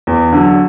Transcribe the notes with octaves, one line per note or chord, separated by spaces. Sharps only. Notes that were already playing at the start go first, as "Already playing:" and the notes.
E2
D3 F#3